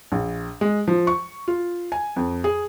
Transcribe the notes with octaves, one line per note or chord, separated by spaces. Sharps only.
A#1
G#3
F3
C#6
F4
G#5
F2
G#4